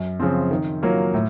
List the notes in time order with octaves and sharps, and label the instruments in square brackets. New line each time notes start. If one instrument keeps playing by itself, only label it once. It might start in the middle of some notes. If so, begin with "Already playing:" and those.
Already playing: [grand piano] F#2
C#3 F3 C4
D#3
F#3 A#3 F4
A2